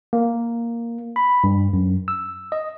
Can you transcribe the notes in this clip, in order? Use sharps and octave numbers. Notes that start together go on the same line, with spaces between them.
A#3
B5
G2
F#2
E6
D#5